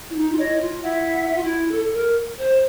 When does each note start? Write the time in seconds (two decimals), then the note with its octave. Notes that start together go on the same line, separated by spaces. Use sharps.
0.10 E4
0.16 D#4
0.32 F4
0.38 E4 C#5 D#5
0.54 E4
0.60 F4
0.82 E4 E5 F#5
1.27 E4
1.35 F4
1.43 E4
1.71 A4
1.93 A#4
2.38 C5